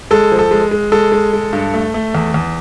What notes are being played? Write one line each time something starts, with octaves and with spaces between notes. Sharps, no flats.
G#3 A4
F3
A4
G#3
G#3
G#3 A4
G#3
G#3
G2
A3
A3
E2
E2